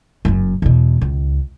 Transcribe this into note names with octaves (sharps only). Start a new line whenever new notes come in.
F#1 F#2
E2 B2
C#2